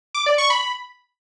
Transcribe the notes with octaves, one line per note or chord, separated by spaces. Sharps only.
D6
D5
C#6
B5